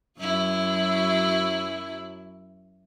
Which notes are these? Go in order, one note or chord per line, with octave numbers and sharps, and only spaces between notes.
F#2 F#3 E4